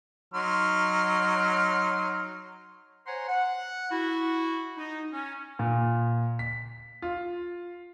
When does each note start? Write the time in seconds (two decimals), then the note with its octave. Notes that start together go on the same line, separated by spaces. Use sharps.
0.34 F#3 D#4 C6 F6
3.06 C5 C#5 F#5 G#5 A#5 C6
3.28 F#5
3.91 E4 F#4
4.77 D#4
5.12 C#4
5.59 A#2
6.39 B6
7.02 F4